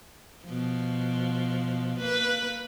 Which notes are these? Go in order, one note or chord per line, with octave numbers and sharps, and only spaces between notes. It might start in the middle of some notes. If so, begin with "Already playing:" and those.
B2 F3
A#3 B4